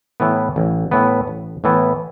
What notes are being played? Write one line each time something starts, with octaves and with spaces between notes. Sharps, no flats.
A2 E3 B3
A1
A2 E3 B3
A1
A2 E3 B3